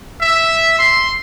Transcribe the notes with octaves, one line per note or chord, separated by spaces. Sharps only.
E5
C6